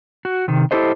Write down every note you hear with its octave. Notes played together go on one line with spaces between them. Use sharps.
F#4
C3 D#3
E4 G4 A4 C5 D#5